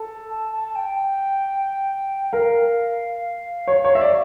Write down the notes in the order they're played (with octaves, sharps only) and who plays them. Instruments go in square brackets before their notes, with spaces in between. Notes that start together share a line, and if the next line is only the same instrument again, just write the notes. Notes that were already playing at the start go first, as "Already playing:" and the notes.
Already playing: [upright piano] A4
[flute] A5
A5
G5
[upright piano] A#4 [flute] F5
[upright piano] C#5
C#5
E5
D5